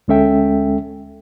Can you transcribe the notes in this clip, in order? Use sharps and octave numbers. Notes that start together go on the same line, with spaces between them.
D2 G#3 C#4 A4 E5 G5